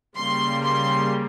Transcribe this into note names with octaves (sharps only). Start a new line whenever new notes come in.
C#3 G3 A#3 C6
C6